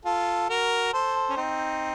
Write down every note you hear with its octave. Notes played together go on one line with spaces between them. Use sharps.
F4 A4
F#4 A#4
A4 C5
C#4
C4 D#4